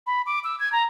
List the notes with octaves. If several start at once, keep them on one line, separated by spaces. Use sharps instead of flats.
B5
D6
E6
G#6
A#5